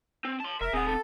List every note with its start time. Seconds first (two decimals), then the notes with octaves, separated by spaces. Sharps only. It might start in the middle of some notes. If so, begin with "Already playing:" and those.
0.25 C4
0.40 A5 C6
0.61 F1 A#4 E5
0.73 D#1 C4 G#4 F#5
0.87 A4